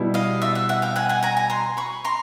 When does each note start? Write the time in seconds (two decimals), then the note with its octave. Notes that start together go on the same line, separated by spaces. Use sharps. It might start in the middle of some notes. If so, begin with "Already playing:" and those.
Already playing: B2 G3 B3 E4 G4
0.14 D#5 F5
0.42 D5 E5
0.55 E5 F#5
0.69 E5 F#5
0.82 F5 G5
0.96 F#5 G#5
1.09 F#5 G#5
1.23 G#5 A#5
1.37 G#5 A#5
1.50 A#5 C6
1.77 B5 C#6
2.05 A#5 C6